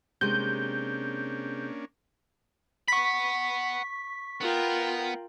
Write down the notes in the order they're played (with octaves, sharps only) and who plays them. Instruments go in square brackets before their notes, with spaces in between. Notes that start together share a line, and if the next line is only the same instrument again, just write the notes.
[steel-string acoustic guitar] C3 G#3 [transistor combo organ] A#3 C#4 D4 [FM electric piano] G6
[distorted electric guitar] F#5 B5 [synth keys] C#6 B6
[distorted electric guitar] B3 [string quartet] F4 A#4 G5